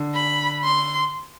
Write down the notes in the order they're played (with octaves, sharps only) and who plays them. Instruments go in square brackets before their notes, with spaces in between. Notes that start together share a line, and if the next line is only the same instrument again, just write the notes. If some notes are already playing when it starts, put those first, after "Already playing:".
Already playing: [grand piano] D3
[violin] B5
C6